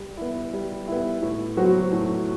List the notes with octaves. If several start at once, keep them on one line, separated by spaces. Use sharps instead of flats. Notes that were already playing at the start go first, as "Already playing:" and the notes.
Already playing: G3
B3 E4
G3
B3 E4
A2
F#3 B3 F#4 C5
A2